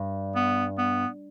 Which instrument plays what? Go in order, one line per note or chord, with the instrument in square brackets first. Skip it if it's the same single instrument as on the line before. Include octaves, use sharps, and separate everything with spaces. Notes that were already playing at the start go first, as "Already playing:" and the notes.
Already playing: [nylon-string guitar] G2
[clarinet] B3
B3